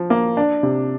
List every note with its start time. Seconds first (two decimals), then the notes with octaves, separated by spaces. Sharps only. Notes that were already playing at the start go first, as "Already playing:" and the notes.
Already playing: F3
0.10 A#3
0.37 D4
0.63 C3